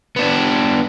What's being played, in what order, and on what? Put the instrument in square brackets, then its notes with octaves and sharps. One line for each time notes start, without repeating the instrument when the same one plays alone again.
[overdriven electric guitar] B3 D4